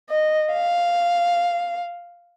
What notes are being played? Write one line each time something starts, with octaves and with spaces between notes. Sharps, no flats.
D#5
F5